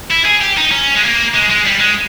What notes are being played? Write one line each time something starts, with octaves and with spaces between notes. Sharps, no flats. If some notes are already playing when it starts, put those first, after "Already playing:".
E4
G#4
G4
D#4
C#4
G#3
A#3
G#3
G#3
G3
G#3